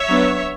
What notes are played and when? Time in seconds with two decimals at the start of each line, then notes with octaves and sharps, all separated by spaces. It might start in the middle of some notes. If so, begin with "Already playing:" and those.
Already playing: C#5 E5
0.08 F#3 B3 D4